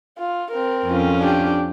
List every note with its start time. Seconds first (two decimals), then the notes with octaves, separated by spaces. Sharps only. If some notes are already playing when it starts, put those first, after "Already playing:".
0.18 F4
0.51 C4 A#4
0.86 F2 C#4 F4
1.20 D4 G4